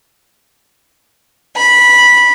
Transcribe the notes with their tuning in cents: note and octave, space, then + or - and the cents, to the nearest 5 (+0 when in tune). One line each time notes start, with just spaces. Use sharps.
B5 -15